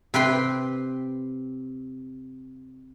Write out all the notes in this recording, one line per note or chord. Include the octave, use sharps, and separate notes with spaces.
C3 B4 G5 C6